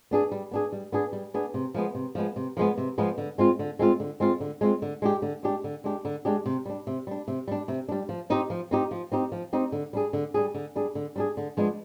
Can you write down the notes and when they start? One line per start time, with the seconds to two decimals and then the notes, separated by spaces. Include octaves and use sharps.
0.11 B3 D4 G#4
0.32 G3
0.51 B3 D4 G#4
0.72 G3
0.92 B3 D4 G#4
1.13 G3
1.34 B3 D4 G#4
1.54 C3
1.74 F3 G#3 B3
1.95 C3
2.15 F3 G#3 B3
2.36 C3
2.57 F3 G#3 B3
2.78 C3
2.98 F3 G#3 B3
3.18 D3
3.38 G#3 C4 F4
3.59 D3
3.79 G#3 C4 F4
4.00 D3
4.20 G#3 C4 F4
4.40 D3
4.61 G#3 C4 F4
4.82 D3
5.02 G#3 D4 G4
5.22 D3
5.43 G#3 D4 G4
5.64 D3
5.84 G#3 D4 G4
6.05 D3
6.25 G#3 D4 G4
6.46 C3
6.66 G3 D4
6.87 C3
7.07 G3 D4
7.28 C3
7.48 G3 D4
7.68 C3
7.88 G3 D4
8.09 F3
8.30 C4 D#4 G4
8.50 F3
8.71 C4 D#4 G4
8.91 F3
9.12 C4 D#4 G4
9.32 F3
9.53 C4 D#4 G4
9.72 D3
9.93 G3 D4 G#4
10.13 D3
10.34 G3 D4 G#4
10.54 D3
10.75 G3 D4 G#4
10.95 D3
11.16 G3 D4 G#4
11.37 D3
11.57 F3 G#3 B3 D4